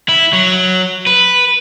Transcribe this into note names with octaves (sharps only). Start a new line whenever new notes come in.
E4
F#3
B4